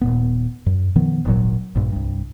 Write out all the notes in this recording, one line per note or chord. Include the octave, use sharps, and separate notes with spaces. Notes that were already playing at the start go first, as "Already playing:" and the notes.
D#1 A#2 B3
F#2
B2 D#3 F3 B3
D#1 G#1 A#2 F#3
A#1 G2
C2 G2